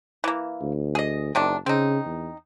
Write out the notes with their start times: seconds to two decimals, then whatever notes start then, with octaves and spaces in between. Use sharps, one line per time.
0.24 E3 A#3
0.62 D2
0.95 G#4 D#5
1.35 F#1 C3 D#3 D4
1.66 C#3 C4 D#4
2.06 E2